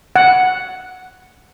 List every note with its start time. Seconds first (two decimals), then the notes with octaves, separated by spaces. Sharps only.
0.16 F#5